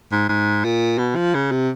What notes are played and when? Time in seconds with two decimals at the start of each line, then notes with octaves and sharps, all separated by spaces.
0.12 G#2
0.29 G#2
0.64 A#2
0.98 B2
1.16 F3
1.34 C#3
1.52 C3